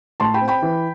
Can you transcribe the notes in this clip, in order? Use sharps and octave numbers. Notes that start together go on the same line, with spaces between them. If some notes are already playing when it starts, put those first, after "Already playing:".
A2 A5 C6
G5 B5
C4
G5 B5
E3